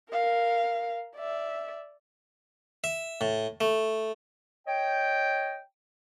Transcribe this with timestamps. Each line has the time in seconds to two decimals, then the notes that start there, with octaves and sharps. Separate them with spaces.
0.11 A#4 F5
1.16 D5 E5
2.84 E5
3.21 A2
3.61 A3
4.67 C#5 D#5 G5